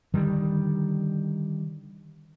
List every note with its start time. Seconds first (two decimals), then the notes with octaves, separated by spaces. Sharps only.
0.14 D3 D#3 G3